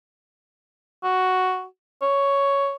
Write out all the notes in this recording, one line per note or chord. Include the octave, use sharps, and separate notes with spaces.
F#4
C#5